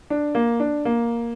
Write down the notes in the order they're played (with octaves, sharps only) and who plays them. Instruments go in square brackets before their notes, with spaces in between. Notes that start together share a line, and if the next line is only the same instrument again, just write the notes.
[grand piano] D4
A#3
D4
A#3